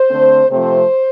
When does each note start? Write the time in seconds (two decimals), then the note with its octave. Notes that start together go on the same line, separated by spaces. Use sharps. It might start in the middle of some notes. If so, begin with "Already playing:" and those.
Already playing: C5
0.09 D3 A3 C4
0.50 C3 F3 A3 C4 C5